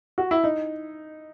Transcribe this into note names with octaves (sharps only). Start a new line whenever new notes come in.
F#4
E4
D#4